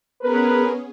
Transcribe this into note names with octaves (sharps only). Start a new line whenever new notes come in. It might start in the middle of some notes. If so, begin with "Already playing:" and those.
B3 C#4 G#4 A#4 B4